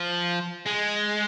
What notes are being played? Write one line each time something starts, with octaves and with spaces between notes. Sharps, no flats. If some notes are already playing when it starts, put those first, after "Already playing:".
Already playing: F3
G#3